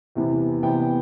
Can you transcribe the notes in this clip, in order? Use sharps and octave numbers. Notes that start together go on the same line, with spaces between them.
E2 C3 E3 B3
E2 C3 E3 B3 G5